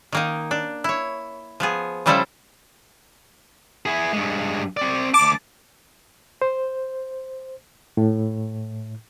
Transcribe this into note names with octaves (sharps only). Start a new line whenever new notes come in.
D#3 A#3 D#4
D4
E4 C#5
F3 B3 G#4
C#3 F3 G3 E4 A4 C5
E4 G#4
G2 G#3
C4 D5
D2 A5 D6
C5
A2